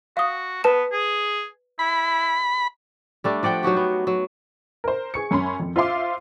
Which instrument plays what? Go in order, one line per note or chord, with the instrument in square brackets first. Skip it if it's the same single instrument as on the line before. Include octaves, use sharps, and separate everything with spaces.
[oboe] F#4 [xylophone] F5 D#6
[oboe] B3 [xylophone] B4 A5 E7
[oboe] G#4
[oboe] E4 [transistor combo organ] B5
[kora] G3 A3 D4
F3 D5 F#5 G5
F#3 D#4 F#4 G4
B3
F#3
[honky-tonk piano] A#4 C5
G#4 C#6 C#7
F#2 C#4 B5 C6
F2
F4 C5 E5 F5 C6 D6